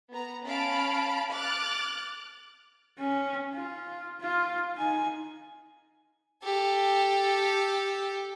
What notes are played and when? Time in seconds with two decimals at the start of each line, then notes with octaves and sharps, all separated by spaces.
0.11 B3 A#5
0.45 C#4 F5 A5 B5 D7
1.31 D6 F6 F#6 A6
2.98 C#4
3.54 F4
4.20 F4
4.75 D#4 G#5
6.43 G4 A4